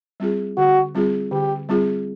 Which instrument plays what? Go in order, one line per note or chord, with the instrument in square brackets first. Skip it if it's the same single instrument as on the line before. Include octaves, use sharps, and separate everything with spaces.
[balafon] G3 C4 F4 G#4
[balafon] D3 [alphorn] F#4
[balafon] G3 C4 F4 G#4
[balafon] D3 [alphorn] G4
[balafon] G3 C4 F4 G#4